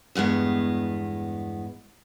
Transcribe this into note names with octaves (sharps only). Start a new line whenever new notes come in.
E2 G2 G#3 B3